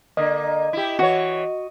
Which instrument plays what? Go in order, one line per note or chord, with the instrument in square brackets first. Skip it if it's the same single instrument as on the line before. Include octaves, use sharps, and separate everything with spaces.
[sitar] D3 A#3 [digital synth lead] D#5
[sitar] E4 G4
[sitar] E3 C#5 [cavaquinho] F#4